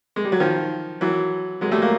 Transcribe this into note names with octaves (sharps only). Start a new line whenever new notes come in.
G#3
G3
F#3
D#3 F3
E3 F#3
F#3 G#3
G3 A3
G#3 A#3